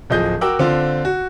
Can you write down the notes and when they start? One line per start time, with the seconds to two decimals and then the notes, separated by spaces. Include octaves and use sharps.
0.10 D1 F3 G#4 D#5 G6
0.41 F#4 A#4 G5 D6 E6 F#6
0.59 D3 C4 D4 F4
1.05 F#4